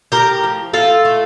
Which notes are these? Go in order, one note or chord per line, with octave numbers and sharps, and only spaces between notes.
A2 G4 A#4
F3
A2 F4 A4
A3